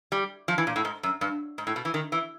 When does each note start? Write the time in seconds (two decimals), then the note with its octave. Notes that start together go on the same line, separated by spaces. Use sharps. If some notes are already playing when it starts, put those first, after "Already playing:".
0.12 G3
0.48 F3
0.58 E3
0.67 A#2
0.76 A2
0.85 G#2
1.03 F#2
1.21 G2
1.58 G#2
1.67 A2
1.76 B2
1.85 E3
1.94 D#3
2.12 E3